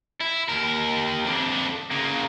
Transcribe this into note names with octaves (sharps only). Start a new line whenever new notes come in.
E4
D#2 A#4
F2 D4
C#3 A#3